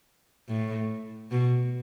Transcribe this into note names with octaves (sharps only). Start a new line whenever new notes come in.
A2
B2